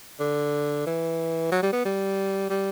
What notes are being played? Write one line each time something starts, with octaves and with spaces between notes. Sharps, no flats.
D3
E3
F#3
G3
B3
G3
G3